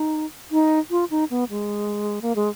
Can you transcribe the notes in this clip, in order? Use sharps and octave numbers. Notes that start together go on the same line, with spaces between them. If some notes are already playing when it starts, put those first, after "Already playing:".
Already playing: D#4
D#4
F4
D#4
B3
G#3
A#3
G#3